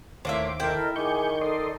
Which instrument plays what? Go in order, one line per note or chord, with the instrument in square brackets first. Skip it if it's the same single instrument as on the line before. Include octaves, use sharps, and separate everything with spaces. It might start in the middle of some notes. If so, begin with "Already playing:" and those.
[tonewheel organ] D#2 C5 D6 [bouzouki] A2 A#3 E5
[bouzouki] E4 G5 [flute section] A4 A#4 D#5
[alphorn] D#3 [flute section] G#4 G#5 D6 [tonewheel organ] C#6 G6
[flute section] D#4 A4 [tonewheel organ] D5 D#5 C6